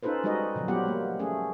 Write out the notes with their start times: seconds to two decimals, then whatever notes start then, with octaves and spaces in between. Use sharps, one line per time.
0.03 C#4 D#4 F4 A4 B4 C5
0.24 G3 G#3 D#4 F#4 B4 D#5
0.55 A#2 C#3 F3 F#3
0.68 F#3 G3 B3 F4 G4 F#5
0.85 G3 A3 A#3
1.19 A3 C#4 G#4